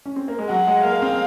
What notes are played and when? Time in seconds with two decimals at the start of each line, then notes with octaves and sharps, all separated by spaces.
0.05 C#4
0.16 C4
0.28 A#3
0.39 G#3
0.50 F#3 F#5
0.67 G#3
0.84 A#3 F5
1.02 C4